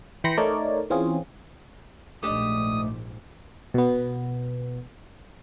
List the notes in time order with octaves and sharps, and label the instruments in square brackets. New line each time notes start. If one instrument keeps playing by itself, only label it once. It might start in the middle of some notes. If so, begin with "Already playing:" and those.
[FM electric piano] E3 G5 B5 C6 A#6 C#7
A3 D#4 A#4 C#5 D5
E3 C4 C#4 F4 G#4
[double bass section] A#1 G#2 [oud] A3 D4 G4 [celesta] D#5 D6 [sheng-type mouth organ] D#6
[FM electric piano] B2 B3